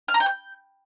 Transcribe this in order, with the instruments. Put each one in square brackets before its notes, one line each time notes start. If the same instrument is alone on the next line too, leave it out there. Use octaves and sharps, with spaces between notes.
[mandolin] F6
A#5
G5
G6